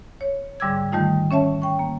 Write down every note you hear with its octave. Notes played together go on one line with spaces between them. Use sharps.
C#5
G#2 D3 G3 D6 E6 G#6
D#3 G3 A3 D#4 F4
C#4 C#5 E5 A5
G5 C#6
A#3